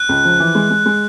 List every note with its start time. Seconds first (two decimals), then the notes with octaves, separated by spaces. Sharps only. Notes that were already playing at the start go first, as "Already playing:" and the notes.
Already playing: F#6
0.09 C#2
0.25 F3
0.40 E3
0.55 G#3
0.71 G#3
0.86 G#3